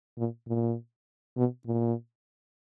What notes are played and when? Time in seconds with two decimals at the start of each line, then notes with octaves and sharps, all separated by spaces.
0.18 A#2
0.48 A#2
1.37 B2
1.66 A#2